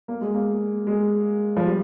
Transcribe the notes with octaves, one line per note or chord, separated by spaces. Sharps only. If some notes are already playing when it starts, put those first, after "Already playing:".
A#3
G#3
A#3
G#3
F3
G3